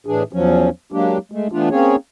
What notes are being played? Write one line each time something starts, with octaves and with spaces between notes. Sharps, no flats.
A2 E3 D4 G#4
E2 F3 F#3 C#4
F#3 G#3 A#3 D4 G4
G#3 A3
E3 A3 B3 D4 F4
A#3 C4 C#4 G#4 C#5